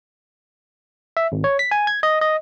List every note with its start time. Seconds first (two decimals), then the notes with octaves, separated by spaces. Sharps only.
1.17 E5
1.32 G#1
1.44 C#5
1.59 B6
1.71 G#5
1.87 G#6
2.03 D#5
2.21 D#5